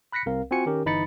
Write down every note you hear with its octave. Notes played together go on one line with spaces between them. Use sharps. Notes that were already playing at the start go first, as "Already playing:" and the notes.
B5 F#6 A#6 B6 C#7
C2 C4 A#4 F5
C4 F4 F#4 G#5 C#7
D#3 C#4 G4 A#4
G1 E3 D#4 B5 A6 C#7